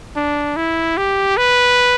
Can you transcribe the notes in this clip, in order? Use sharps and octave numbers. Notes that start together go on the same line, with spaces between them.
D4
E4
G4
B4